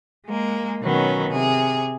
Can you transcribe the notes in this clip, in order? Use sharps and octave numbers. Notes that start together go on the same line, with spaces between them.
G#3 A#3
B2 D#3 F#3 B3 C#4
C3 G#4